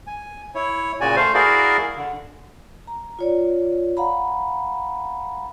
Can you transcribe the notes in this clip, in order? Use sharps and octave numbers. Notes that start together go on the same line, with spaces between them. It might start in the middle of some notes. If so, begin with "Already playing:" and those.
G#5
E4 C#5
A#2 C#3 F#4 D5 G#5
A3 C5 F5
E4 F#4 G#4 A#4 D5 F5
D3
A#5
F4 C#5 D5
F5 F#5 A#5 B5